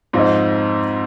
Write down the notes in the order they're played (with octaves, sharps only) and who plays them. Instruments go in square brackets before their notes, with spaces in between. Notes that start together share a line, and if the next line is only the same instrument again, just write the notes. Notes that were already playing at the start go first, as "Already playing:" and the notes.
[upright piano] F2 G#2 [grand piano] C4 F4 C5 D#5